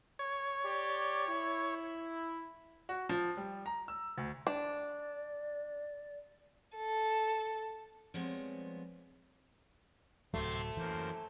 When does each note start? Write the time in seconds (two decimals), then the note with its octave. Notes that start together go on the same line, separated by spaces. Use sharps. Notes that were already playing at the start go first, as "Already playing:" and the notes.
0.19 C#5
0.64 G4 D5
1.28 E4
2.89 F#4
3.09 F3
3.37 G3
3.66 A#5
3.88 E6
4.18 D2
4.47 D4 D5
6.76 A4
8.14 F3 G3 G#3 B3 C4 C#5
10.34 D1 C3 F#3 A3 C6
10.77 F#2 E3 A#3 C5